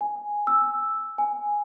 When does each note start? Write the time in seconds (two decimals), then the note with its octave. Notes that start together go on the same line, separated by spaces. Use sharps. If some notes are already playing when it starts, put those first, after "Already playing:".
0.01 G#5
0.47 E6
1.18 G#5